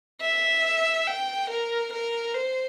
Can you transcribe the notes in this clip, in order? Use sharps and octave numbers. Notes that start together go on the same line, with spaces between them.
E5
G5
A#4
A#4
C5